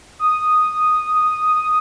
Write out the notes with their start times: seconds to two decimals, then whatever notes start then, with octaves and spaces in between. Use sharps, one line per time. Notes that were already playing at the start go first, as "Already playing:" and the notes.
0.19 D#6